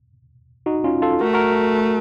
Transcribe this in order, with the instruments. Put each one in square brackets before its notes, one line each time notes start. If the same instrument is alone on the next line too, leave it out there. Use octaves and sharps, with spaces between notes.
[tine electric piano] D#4 F#4
C#4 F4
F4 A4
[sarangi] A3 [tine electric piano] F#4 A#4
[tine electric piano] F#4 A#4